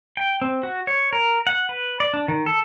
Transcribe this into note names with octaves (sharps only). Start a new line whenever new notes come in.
G5
C4
F#4
C#5
A#4
F#5
B4
D5
D4
D#3
A4